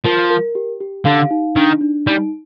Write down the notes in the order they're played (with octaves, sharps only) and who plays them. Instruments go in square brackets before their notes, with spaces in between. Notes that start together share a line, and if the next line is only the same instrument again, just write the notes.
[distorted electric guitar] F3 [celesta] A#4
[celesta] A#4
G4
G4
[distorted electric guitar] D3 [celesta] F5
[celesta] D#4
[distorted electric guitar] D#3 [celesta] D4
[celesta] D4
[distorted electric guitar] G3 [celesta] D#4